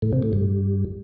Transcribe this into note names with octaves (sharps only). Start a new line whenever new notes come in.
A2
C3
A2
G2